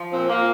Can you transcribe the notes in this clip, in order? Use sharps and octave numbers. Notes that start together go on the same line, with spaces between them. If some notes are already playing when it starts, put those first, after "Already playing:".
Already playing: F3
A#2 C4
A#2 A#3